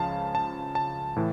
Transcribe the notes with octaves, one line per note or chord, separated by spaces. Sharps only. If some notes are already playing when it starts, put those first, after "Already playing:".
Already playing: C#2 C#3 F3 F5 A5
A5
A5
A2 E3